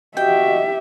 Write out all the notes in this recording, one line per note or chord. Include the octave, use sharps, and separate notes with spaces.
F#4 G4 D#5 E5 G5